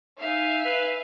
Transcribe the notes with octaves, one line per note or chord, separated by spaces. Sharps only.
D#4 E5 F5 G#5
B4